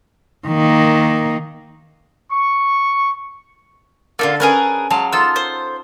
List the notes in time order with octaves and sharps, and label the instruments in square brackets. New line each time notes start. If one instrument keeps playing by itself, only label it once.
[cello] D#3 A#3
[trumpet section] C#6
[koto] D3 A4 [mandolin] A#3 D#4 F4
[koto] C#4 [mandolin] G#4 A#4 B4
[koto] F#3 G#3 F5 [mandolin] A5
[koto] D#4 F4 A4 [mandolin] E6
[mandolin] C5